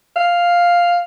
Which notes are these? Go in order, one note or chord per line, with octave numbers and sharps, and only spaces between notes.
F5